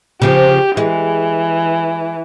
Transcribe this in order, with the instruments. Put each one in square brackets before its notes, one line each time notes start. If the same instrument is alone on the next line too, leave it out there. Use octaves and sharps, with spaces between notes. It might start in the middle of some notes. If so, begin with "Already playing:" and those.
[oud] C#3 F3 [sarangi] G4
[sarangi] E3 [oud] G#3